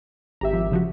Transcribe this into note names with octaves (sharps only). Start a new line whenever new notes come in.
G#1 G4 E5 A#5
F3
C#3 F3 F#4